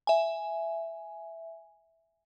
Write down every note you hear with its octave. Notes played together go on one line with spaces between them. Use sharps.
E5 G#5